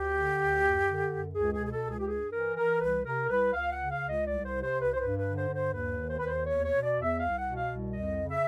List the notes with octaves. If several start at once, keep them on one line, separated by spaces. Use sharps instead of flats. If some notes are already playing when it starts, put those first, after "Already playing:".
Already playing: D2 G4
D3
D2
F#2
D3
F#2
C#2 G#4
G#4
B2
G#4
A4
C#2
G#4
G4
G2 G#4
E3 A#4
E3 A#4
C2 B4
C3 A#4
C2 B4
C#2 F5
F#5
C#3
F5
C#2
D#5
C2 D5
C5
C3
C5
C2
B4
C5
G2 B4
B4
D3
C5
G2
C5
D#2 B4
D#3
C5
B4
D#2
C5
E2 C#5
C#5
B2
D5
E2
E5
C2 F5
F#5
B2
F5
C2
F2 D#5
C#3
E5